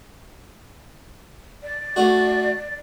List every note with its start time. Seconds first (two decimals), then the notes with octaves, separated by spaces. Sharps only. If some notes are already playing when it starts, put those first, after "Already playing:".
1.63 D5
1.96 A3 D4 F#4